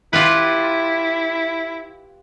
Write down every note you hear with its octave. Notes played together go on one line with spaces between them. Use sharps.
E4 F4 G4 B4